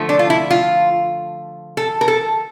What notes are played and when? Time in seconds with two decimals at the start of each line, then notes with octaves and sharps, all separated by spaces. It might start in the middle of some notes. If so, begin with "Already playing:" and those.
Already playing: D3 F3 A3
0.09 D4
0.19 F4
0.30 E4
0.51 F4
1.77 A4
2.01 A#4
2.08 A4